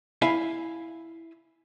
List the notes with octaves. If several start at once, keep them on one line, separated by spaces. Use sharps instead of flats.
E4 E5 F5 G#5